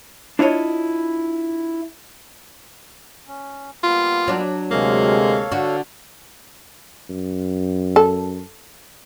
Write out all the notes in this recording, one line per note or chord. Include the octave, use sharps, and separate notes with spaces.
D4 E4 F4 C#5 D#5
C#4
G3 A#3 B3 F4
F#3 D4
D2 C3 G#3 A#3 A4 C#5 F5
D3 F#4
F#2
A4